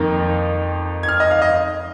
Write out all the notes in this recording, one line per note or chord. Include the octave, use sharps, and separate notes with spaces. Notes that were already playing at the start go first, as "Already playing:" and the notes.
Already playing: F2 D#3 A#3 D#4
G#6
F6
D#5
F5
D#5